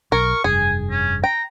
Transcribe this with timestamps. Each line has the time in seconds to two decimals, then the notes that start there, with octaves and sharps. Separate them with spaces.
0.12 B1 A#4 C#6
0.44 F1 G2 G#4 G#5
0.90 C#4
1.24 G5 A#5